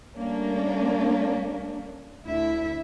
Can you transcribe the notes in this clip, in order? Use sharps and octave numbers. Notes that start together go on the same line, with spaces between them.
G3 A3 A#3 C#4 D4
D2 E4 E5